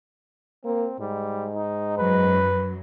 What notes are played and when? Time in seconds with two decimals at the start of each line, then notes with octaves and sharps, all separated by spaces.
0.65 A#3 C4
1.00 G#2 G3
1.55 D#4
1.98 F#2 F#3 B4